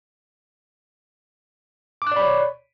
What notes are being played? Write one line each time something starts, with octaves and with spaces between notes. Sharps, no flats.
C#5 D5 B5 D6 F#6